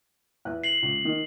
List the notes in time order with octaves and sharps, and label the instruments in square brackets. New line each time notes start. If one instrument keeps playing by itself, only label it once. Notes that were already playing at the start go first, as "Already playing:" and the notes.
[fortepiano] E2 B4 F#6
[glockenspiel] C7 F#7
[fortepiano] C#2
D#3